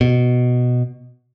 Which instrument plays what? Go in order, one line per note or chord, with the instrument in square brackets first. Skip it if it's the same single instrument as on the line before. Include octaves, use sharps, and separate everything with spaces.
[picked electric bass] B2